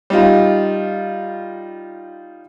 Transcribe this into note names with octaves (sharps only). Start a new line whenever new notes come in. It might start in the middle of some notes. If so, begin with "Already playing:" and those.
G3 D#4 F4